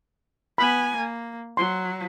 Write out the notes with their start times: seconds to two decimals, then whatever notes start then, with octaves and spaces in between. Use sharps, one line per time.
0.58 B3 G#5 B5
0.96 A#3
1.57 F#3 C6